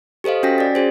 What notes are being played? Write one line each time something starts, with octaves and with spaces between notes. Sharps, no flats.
G4 A4 C5 D#5 F5
C#4 F#4 G5 G#5 A#6 B6
D5 A6
C#4 F#4 G#4 C5